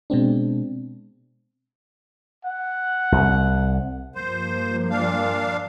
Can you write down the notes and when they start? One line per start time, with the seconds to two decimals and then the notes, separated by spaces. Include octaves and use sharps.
0.10 B2 G#3 C4 D4
2.45 F#5
3.12 C2
4.15 G2 F3 A#3 C5
4.90 A#2 D4 F5